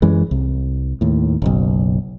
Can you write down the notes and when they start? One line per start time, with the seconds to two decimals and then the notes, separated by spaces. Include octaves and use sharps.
0.02 F#2 E3 G#3
0.31 C2
1.01 D#2 A2
1.42 F#1 B1